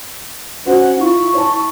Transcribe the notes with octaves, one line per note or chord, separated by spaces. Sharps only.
C#4 F#4 C5 F#5
E4 F4 C#6
C#5 A5